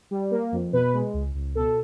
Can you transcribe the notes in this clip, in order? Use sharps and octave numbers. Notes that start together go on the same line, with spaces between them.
G3
A#3
F2
B2 B4
G#3
C#2
C#2
B2 A4